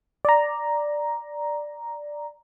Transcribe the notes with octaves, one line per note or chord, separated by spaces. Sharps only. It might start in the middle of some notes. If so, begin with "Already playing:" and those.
D5 A#5